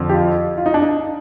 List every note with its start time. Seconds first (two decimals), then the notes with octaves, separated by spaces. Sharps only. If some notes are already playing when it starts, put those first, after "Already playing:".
Already playing: F2 D3 F3
0.09 G4
0.13 F4
0.57 F4
0.66 D#4
0.74 D4
0.82 D#4